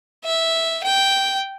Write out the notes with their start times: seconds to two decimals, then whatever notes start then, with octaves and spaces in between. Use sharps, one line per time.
0.24 E5
0.84 G5